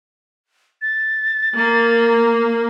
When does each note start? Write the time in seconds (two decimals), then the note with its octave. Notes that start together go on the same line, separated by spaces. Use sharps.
0.82 A6
1.57 A#3